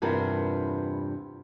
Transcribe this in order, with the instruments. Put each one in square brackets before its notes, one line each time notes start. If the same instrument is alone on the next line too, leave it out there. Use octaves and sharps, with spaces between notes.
[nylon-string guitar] E2 G2 C3 F4 A#4 B4